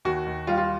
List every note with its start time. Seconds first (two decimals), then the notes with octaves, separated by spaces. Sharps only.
0.05 D#2 F#4
0.26 D#2
0.47 G3 F4
0.57 F4